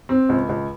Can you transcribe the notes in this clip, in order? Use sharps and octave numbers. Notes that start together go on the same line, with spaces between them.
C4
C#2
C#2